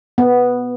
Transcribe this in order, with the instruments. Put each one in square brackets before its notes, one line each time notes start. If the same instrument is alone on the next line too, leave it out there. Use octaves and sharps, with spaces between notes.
[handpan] B3